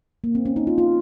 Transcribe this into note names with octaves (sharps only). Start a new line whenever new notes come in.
A#3
C4
C#4
D#4
F4
F4